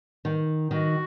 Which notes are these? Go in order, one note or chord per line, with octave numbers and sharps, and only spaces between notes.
D#3
D#3 F#4